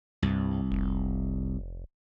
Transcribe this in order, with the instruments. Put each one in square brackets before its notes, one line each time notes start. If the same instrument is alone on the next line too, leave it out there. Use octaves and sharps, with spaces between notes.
[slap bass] C2 [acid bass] G2
[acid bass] F1